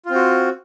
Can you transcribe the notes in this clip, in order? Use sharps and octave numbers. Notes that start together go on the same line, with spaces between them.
C4 F4 F#4